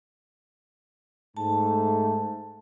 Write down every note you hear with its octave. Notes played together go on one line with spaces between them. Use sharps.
G#2 A3 A5